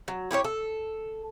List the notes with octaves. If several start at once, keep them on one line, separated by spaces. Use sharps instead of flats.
F#3
E4 G4 A4 C#5
A4